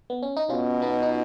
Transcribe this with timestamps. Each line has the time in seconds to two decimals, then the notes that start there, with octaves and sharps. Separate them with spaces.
0.10 B3
0.23 C#4
0.37 D#4
0.49 B2 C#4 F4
0.82 B3 D#4
1.03 D#4